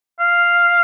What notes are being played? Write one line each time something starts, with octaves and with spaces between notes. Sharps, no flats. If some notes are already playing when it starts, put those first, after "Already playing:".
F5